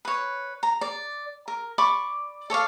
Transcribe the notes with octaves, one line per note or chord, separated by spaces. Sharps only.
B4 C#5
A#5
D5
A#4
D5 B5 C#6 D6
A4 C#5 D5 F5